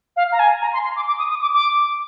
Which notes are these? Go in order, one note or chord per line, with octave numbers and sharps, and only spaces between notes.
F5
A#5
G#5
A#5
C6
C6
D6
D6
D#6
D#6
D6
D6